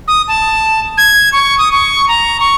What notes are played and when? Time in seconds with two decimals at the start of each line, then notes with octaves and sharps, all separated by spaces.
0.08 D#6
0.28 A5
0.98 G#6
1.33 C#6
1.58 D#6
1.72 C#6
2.08 A#5
2.40 C#6